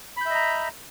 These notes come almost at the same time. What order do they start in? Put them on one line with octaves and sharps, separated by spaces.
B5 G6 E5 D#5 A#5